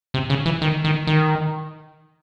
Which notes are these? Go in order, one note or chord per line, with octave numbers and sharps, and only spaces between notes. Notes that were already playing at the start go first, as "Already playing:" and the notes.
C3
C#3
E3
D#3
D#3
D#3